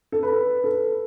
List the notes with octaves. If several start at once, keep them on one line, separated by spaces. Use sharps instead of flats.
A4
B4
A4